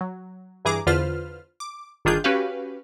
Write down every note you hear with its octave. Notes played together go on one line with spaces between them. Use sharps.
F#3
G2 E3 G#4 A#5 D6
E2 D3 F4 B4 C5 F6
D6
G1 D#3 D4 F4 G#4 G6
C#4 F#4 G4 B4 F5